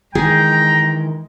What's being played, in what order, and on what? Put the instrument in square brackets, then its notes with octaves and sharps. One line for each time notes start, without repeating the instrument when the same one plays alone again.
[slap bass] D#3 E3 [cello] G#3 [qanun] G#4 [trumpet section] G5 A#5